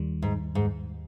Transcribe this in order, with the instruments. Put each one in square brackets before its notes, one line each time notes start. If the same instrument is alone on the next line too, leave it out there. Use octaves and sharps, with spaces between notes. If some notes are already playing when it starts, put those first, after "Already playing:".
Already playing: [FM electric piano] D#2 D#3 G3
[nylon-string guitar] G#2
G#2